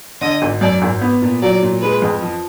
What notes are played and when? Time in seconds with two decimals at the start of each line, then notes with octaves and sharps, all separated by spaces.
0.21 D3 D#5
0.42 G#1
0.61 F#2 D5
0.82 G#1
1.01 B3
1.22 A#2
1.42 F#3 D5
1.62 A#2
1.82 G#3 B4
2.02 F2
2.22 F3